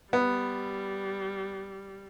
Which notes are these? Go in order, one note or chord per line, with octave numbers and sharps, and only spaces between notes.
G3 B3